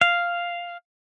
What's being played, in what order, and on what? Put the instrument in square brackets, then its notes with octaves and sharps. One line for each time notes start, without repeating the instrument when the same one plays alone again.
[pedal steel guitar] F5